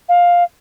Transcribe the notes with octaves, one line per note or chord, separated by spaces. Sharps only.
F5